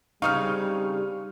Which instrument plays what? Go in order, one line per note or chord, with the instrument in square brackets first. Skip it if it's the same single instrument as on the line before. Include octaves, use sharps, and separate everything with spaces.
[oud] C#3 C4 D#4 [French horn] G3 [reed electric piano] F5 [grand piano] C#6 D#6 F6